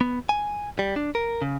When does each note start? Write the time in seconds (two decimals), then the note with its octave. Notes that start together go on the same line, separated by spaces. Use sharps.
0.01 B3
0.29 G#5
0.79 G3
0.96 D4
1.15 A#4
1.42 C#3